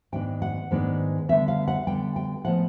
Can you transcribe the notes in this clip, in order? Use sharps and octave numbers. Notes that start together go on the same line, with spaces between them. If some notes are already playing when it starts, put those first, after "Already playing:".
G#2 D#3 G#3 B3 D4 G5
F#5
G#2 D#3 G#3 B3 D4
D3 G3 B3 E5
F5
F#5
D3 G3 B3 G5
G5
A2 F3 G#3 B3 F#5